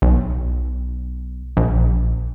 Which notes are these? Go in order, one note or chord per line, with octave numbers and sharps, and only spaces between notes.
B1
A#1